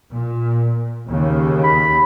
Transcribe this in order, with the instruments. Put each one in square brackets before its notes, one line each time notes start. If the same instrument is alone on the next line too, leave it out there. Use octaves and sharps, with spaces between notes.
[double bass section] A#2
D#2 C#3
[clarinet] B5